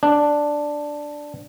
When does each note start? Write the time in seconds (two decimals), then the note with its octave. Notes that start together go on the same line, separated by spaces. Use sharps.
0.03 D4